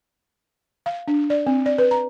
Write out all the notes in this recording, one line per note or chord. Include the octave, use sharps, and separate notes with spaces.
F5
D4
D5
C4
D5
B4
A#5